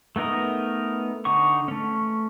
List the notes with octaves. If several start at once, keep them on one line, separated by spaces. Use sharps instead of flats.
A3 B3 D#4 A#4 D#5
D3 D#4 F#5 C#6
A3 C#4